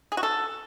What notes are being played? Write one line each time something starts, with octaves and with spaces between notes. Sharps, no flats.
G#4
F#4
A4